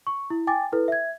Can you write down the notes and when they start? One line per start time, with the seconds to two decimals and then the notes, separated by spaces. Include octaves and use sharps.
0.07 C#6
0.30 E4
0.47 G5 G#5 D6 A6
0.73 E4 A4 B4
0.88 E5 G#6